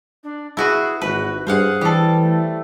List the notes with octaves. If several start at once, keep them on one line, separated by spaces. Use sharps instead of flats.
D4
E4 F#4 G#4 B4
G#1 F#4 B4
G2 G#4 C5 F5 F#5
E3 G3 A4
A3